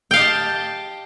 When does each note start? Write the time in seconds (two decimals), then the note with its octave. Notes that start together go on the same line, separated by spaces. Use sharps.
0.11 G5
0.13 F5
0.16 D#5
0.19 G4
0.21 A5